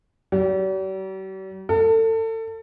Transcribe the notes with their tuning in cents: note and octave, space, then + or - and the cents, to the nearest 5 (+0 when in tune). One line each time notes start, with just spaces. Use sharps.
G3 -45
A4 +30